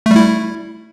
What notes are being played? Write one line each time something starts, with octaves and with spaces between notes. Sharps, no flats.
G3 A3 E4